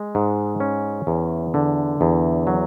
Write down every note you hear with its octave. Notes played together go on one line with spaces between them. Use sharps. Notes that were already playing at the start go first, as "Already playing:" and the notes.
Already playing: G#3
G#2
C#4
E2
D3
E2
F#3